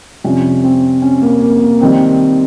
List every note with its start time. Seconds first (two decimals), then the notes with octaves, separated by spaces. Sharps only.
0.24 F2 C3 G3 C#4
0.64 C4
1.02 C#4
1.22 A#3
1.41 A#3
1.61 A#3
1.80 D#3 G3 C4